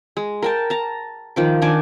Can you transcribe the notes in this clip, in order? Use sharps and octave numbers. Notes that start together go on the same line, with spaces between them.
G#3
A#4 G5 A5
A5 A#5
D#3 F3 D6
D#3 D4 G#5 D6